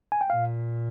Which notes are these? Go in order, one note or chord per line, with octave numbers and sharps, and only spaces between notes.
G#5
G5
A#2 F5